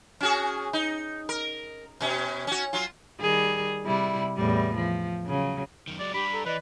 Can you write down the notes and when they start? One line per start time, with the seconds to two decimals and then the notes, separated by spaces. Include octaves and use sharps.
0.21 C#4 F#4 G#4
0.73 D#4
1.29 A#4
2.01 B2 C#4
2.47 C#4 F#4
2.73 F#3 F4
3.20 D#3 G3 G#4
3.85 C3 G3 E4
4.37 E2 A2 G3
4.75 F3
5.27 C#3 F#3
5.88 F#2 D#3
6.00 F#3 G#3 D5
6.14 G3 D4 G4 B5
6.31 A4 A#5
6.46 E3 B4 D5 D#5